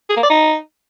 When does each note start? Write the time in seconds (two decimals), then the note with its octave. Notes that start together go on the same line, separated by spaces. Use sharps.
0.09 G#4
0.16 A#3
0.23 D5
0.30 D#4